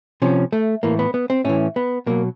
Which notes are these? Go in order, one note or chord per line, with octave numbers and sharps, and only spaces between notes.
C3 F3 C#4
A3
A2 E3 A#3
B3
B3
C4
A2 E3 C#4
B3
B2 F#3 A#3